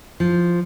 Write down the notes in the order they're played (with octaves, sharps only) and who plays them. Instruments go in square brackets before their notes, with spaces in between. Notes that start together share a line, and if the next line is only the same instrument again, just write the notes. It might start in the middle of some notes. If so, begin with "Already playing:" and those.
[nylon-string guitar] F3